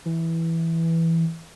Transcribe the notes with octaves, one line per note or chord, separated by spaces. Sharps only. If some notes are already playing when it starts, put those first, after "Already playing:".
E3